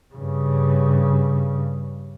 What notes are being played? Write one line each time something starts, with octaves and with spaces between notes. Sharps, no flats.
G2 C#3